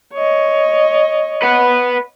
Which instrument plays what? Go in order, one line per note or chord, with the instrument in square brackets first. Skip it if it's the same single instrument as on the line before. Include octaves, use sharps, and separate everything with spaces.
[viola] C#5 D#5
[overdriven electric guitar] B4 F#5